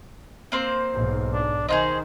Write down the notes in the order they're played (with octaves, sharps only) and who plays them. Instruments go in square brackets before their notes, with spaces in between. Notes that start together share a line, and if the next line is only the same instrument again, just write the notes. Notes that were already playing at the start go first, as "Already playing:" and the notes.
[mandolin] A#3 C4 C5
[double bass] B1 G#2
[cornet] D4
[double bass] D#3 [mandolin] D#4 F4 G#4 [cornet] C5